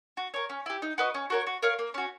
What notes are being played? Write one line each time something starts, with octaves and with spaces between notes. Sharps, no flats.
F#4
A#4 C#5
C#4
E4 G4
D#4
F#4 B4 D#5
C#4
F#4 A#4 C#5
F#4
A#4 C#5 F5
A#3
C#4 F#4